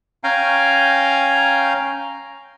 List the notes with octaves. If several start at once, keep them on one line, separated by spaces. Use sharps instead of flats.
C#4 F5 G5 G#5 A#5